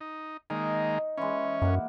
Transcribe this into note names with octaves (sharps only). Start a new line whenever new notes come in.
D#4
D#3 G#3 A#3 D#4
E3 G#3 C#4
F#2 A#3 F#5